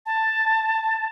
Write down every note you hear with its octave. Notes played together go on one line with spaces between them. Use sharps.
A5